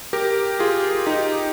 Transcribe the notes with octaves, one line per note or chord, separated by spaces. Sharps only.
G4 A#4
F4 G#4
D#4 G4